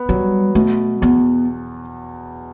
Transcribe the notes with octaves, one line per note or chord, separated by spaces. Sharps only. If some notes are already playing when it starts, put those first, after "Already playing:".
Already playing: B3
F#3 G3
B2 A3
E2 B3